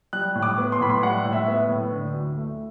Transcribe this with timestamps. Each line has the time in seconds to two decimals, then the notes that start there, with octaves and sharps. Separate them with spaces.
0.13 G3 F#6
0.35 A2
0.43 D6
0.58 B3
0.72 C6
0.81 A2 B5
0.90 C6
1.03 G3 F#5
1.24 A2
1.33 E5
1.48 B3
1.69 A2
1.91 D3
2.14 D2
2.37 A3